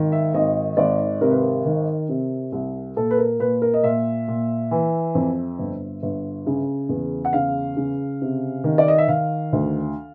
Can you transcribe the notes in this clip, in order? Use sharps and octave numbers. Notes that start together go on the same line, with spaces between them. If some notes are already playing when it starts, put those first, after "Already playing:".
Already playing: G#1 D#3
E5
G#1 D#5
G#1 D5
C3 A#4
B4
A#4
D#3
C3
C2
A#2 A4
B4
A#4
A#2 B4
A#4
D#5
A#2 E5
A#2
E3
F2
G1
G1
C#3
E2
F#5
C#3 F5
C#3
C3
D#3
D5
D#5
E5
D#3 F5
D2